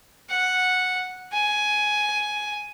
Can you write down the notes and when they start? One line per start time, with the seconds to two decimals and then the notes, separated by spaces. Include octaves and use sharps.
0.30 F#5
1.33 G#5